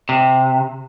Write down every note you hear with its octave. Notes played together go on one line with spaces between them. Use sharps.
C3